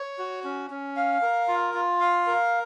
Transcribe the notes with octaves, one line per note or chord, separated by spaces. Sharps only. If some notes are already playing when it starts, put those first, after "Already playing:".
Already playing: C#5
F#4
C#4
C#4
F5
A#4
F4
F4
F5
A#4